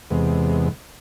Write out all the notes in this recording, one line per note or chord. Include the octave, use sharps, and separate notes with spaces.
E2 C3 G#3 B3